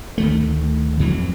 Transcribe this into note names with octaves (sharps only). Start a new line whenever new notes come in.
D2 D#3 A3
F2 E3 F#3